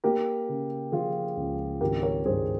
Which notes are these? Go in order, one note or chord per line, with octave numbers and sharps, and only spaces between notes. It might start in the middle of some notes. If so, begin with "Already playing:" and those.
A#3 G4 A#4
C#3
F3 F4 G#4
C#2
G#1 G4 A#4
A#4 C#5
G2 G#4 C5